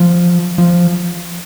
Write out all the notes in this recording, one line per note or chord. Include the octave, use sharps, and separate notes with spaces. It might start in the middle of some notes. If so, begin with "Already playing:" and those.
Already playing: F3
F3